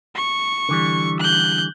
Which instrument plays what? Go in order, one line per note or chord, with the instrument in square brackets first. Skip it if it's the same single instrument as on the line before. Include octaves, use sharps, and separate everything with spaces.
[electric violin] C#6
[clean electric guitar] D3 E3 G3
[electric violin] F#6 G6